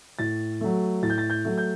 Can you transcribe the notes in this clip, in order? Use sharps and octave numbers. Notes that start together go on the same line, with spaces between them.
A2 A6
F#3 A3
A2 A6
G6
A6
G6
F#3 A3
G6